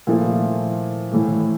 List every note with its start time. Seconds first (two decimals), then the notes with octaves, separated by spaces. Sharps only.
0.07 A#2 F3 A3 E4
1.12 A2 E3 A3